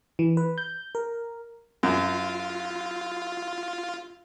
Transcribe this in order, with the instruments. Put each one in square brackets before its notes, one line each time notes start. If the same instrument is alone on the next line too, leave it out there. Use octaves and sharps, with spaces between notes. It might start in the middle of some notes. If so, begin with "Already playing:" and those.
[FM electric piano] E3
B4
G6
A#4
[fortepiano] F#2 [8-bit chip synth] F4